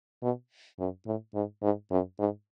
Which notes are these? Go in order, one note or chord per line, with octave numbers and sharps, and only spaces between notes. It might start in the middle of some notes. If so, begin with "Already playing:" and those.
B2
F#2
A2
G#2
G#2
F#2
G#2